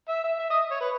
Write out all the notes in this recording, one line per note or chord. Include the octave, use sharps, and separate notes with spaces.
E5
E5
E5
D#5
C#5
B4